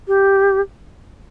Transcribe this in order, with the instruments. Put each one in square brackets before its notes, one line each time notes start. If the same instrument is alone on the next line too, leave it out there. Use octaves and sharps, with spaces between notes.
[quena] G4